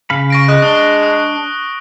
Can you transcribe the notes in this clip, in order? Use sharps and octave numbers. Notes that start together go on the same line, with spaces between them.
C#3 F5 B5
C#6 A#6 D7
G#3 F#6
D4 D#6 G7
D#6